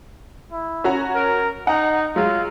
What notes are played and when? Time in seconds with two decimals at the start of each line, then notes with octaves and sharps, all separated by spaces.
0.52 E4
0.84 C#4 F#4 A#5
1.15 A#4
1.67 D#4 F#5 A#5
2.16 F#3 G#3 F4